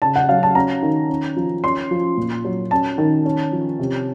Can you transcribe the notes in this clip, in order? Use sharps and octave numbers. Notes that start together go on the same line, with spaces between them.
C#3 A5
F#5
F#3 F5
A5
C#4 A#5
D#3
C#4
F3
C#4 C6
F3
A#2
F#3
C#4 A5
D#3
C#4
F3
C3